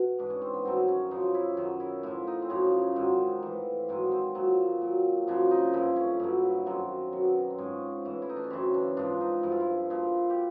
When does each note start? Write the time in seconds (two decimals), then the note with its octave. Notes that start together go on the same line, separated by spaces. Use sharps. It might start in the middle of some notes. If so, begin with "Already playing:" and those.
Already playing: B2
0.19 G#2 E3 D4
0.30 C#4
0.42 C4
0.54 B3
0.65 G2 D#3 F#3 C4
0.88 C#4
1.11 F#2 C#3 F3 D#4
1.35 E4
1.57 F#2 D#3 F#3
1.80 E4
2.03 A2 F3 E4
2.27 D#4
2.42 C4
2.50 F#2 C#3 F3 C#4
2.96 G#2 D#3 F#3 C4
3.43 A2 E3
3.89 G#2 D#3 F#3 C4
4.12 C4
4.35 A#2 F#3
4.81 A#2 F#3
5.27 F#2 C#3 F3 D4
5.51 D#4
5.73 G2 D3 F3 E4
5.96 C#4
6.20 G2 D3 F#3
6.66 F#2 D#3 F#3 C4
7.13 B2 F#3
7.50 C4
7.58 G#2 F3 C#4
8.05 A2 E3
8.22 E4
8.29 D#4
8.36 D4
8.44 C#4
8.50 F#2 C#3 E3 C4
8.74 D4
8.97 G#2 F3 D4
9.21 D#4
9.43 G2 D3 F3 E4
9.52 F4
9.60 E4
9.90 A#2 F3
10.30 G4